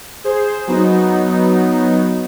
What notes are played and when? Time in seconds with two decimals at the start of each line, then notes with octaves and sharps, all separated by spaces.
0.24 G#4 C5
0.67 F#3 B3 D#4